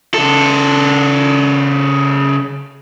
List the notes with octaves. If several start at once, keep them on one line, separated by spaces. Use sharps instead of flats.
C#3 A4